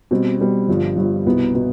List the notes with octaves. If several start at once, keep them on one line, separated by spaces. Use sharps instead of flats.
B2 G3 C4
B2 G3 C4
G1 G2 F3
G1 G2 F3
C2 B2 B3
B2 B3